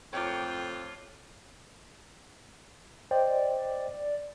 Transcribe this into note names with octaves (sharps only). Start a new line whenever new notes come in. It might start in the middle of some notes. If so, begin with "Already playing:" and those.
F2 A2 F4 A4 A#4 C#5 G5 D6
C5 D5 D#5 G5